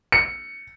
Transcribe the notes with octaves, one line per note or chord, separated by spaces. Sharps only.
C#7